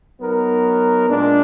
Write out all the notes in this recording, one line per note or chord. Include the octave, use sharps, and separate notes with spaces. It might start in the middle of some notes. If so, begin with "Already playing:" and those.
F#3 B3 D#4 A#4
A#2 G#3 D4